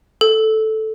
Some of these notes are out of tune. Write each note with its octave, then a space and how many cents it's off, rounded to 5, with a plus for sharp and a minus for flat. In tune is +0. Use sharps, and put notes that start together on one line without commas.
A4 -5